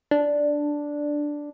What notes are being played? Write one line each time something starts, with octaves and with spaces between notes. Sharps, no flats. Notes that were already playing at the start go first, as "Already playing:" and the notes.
D4